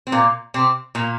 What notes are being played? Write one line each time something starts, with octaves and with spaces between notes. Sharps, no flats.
C4
A#2 A#3
C3 C4
A#2 A#3